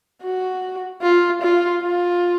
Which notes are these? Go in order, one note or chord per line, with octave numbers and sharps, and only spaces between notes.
F#4
F4
F4
F4